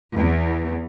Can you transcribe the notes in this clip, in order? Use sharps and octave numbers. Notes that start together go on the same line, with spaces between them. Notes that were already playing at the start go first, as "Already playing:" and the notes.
E2